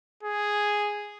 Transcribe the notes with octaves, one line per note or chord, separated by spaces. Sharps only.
G#4